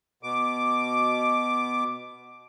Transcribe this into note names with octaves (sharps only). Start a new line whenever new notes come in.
B2 D6